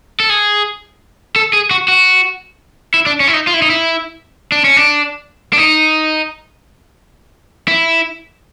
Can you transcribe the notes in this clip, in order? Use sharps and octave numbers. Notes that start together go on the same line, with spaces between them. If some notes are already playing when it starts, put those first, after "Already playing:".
A4
G#4
A4
G#4
F#4
F#4
E4
D4
C#4
E4
D#4
F4
E4
D#4
E4
D4
C#4
D4
D4
D#4
E4